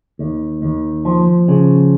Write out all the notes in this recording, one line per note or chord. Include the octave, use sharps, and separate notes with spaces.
D#2
D#2
F3
C#3